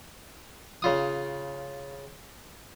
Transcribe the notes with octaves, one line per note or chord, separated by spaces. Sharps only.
C#3 F4 D#6